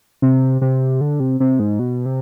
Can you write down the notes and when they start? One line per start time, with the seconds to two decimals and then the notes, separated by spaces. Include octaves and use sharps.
0.22 C3
0.61 C3
1.01 D3
1.20 C3
1.40 C3
1.59 G#2
1.79 B2
2.06 C3